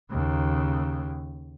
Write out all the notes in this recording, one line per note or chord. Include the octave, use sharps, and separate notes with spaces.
D#2 C#3